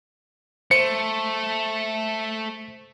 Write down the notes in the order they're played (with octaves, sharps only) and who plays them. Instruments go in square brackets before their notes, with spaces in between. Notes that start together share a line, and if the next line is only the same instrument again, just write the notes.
[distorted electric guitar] A3 [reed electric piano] C5 [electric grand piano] C#7